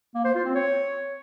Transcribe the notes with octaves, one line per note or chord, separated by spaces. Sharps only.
A#3
C5
F4
C4
C#5